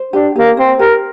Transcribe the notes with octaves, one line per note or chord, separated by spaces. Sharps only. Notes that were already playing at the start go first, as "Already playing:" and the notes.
Already playing: C5
D4 G4
A#3 G4
C4 C5
G4 A#4